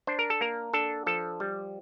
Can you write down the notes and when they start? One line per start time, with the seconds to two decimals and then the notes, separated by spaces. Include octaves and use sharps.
0.07 D4 C5
0.19 A#4
0.30 A4
0.41 A#3 A#4
0.73 D4 A4
1.07 F3 A4
1.40 G3